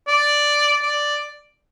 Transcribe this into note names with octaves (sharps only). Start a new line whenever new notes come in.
D5
D5